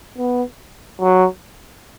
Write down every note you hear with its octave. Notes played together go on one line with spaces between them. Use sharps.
B3
F#3